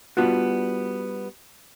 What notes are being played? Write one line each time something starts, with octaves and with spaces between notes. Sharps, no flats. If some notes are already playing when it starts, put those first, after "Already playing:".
G3 B3 D4 F4 F#4